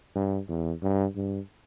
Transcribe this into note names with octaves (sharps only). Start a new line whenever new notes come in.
G2
E2
G2
G2